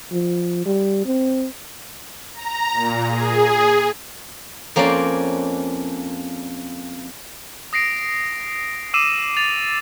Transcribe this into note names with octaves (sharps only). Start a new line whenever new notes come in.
F3
G3
C4
A#5
A#2
G#4
F2 A#3 C#4 C5 D5
D#6 A#6 C7 D7
D6 E6 C7 D#7 E7
A6 F7